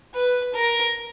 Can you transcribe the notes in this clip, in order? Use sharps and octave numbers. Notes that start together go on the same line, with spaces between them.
B4
A#4